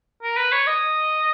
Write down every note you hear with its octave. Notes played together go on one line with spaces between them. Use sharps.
A#4
B4
C#5
D#5